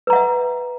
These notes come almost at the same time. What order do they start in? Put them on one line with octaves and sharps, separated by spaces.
B4 A#5 F#5 E5